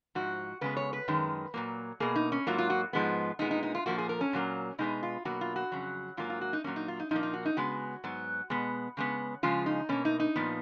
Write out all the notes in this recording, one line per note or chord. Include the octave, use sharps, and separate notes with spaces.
G#2 F3 F#4
C#3 G#3 B3 B4
C#5
B4
F#2 D#3 G#3
A#2 F#3 A#3
B2 A#3 G#4
D#4
C#4
G#2 F#3 A#3 F4
F4
F#4
G#2 F3 G#3 B3
A#2 G#3 B3 D#4
D#4
D#4
F4
A#2 F3 A#3 F#4
G#4
A#4
C#4
A#2 F#3 A#3
B2 G#3 B3 D#4
F4
B2 F#3 A#3 F#4
F4
F#4
F2 C#3 F#3
G#2 F#3 A#3 F4
F4
F#4
D#4
A#2 F#3 A#3 C#4
D#4
F4
D#4
A#2 F3 A#3 D#4
D#4
F#4
D#4
C#3 G#3 B3 F#4
G#2 F#3 B3
B2 G#3 B3
C#3 G#3 B3
C#3 F3 G#3 F4
D#4
B2 A#3 C#4
D#4
D#4
A#2 F3 B3